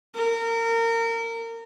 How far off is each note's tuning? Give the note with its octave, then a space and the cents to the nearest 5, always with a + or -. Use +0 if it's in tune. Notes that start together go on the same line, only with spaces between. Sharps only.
A#4 -25